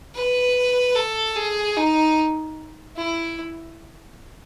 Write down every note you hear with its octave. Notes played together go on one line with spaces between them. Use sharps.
B4
A4
G#4
D#4
E4